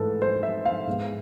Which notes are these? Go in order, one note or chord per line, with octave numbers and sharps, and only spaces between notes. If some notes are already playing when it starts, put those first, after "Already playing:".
Already playing: G#2 E3 A3 A4 B4
C5
E5
F5
G#2 G#3 B3